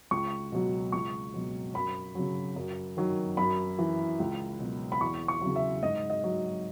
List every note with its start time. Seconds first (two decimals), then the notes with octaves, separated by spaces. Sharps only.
0.11 C#2 C#6
0.52 B2 F#3
0.92 C#2 C#6
1.34 B2 F#3
1.74 F#2 B5
2.15 C#3 F#3
2.56 F#2
2.97 D#3 F#3
3.37 F#2 B5
3.79 E3
4.20 C#2
4.60 B2 F#3
4.92 B5
5.01 E2 C#6
5.28 C#6
5.41 C#3 F#3
5.56 E5
5.83 G#2 D#5
6.10 D#5
6.24 F#3